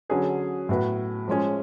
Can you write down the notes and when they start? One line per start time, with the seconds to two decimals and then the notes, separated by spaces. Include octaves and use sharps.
0.09 D3 F#3 C#4 G#4 B4
0.69 A2 F#3 B3 F#4 B4
1.28 F3 G#3 C#4 G#4